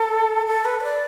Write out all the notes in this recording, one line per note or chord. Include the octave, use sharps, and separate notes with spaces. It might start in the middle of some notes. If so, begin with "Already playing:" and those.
Already playing: A4
A4
B4
B4
D5